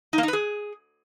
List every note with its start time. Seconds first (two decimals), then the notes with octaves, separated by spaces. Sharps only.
0.13 D#4
0.18 A#3
0.23 D#4
0.28 B4
0.33 G#4